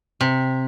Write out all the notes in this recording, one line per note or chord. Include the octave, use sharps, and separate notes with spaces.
C3